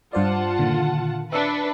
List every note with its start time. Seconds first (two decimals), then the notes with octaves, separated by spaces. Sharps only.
0.13 G2 F4 C5 D5 F#5 A5
0.59 A#2 D3 D#3
1.33 D4 B4 E5 E6 C#7